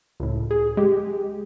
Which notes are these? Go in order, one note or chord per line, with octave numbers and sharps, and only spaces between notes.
C#2 A2
G#4
G#3 G4